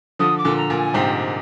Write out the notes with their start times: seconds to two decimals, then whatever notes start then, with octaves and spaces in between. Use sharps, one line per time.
0.19 D3 F3 D#6
0.38 D6
0.45 A#2 D3
0.57 A#5
0.70 A#2
0.75 G#5
0.94 G#2 C3 G5